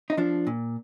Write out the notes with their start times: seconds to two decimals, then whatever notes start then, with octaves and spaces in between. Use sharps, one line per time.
0.10 D#4
0.17 F3 D4
0.47 A#2